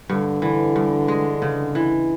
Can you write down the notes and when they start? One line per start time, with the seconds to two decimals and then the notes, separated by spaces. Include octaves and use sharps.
0.09 G2 D3
0.42 D3 E3
0.76 G2
1.08 G#3
1.42 C#3
1.75 E3